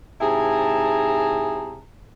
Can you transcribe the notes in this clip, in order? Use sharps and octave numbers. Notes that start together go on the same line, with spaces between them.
G#2 C3 E4 G#4 A5 A#5